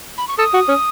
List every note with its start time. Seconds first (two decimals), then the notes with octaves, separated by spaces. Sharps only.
0.18 B5
0.28 C#6
0.38 A4 D#6
0.54 F#4
0.68 C#4